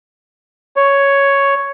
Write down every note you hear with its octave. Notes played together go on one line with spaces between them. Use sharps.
C#5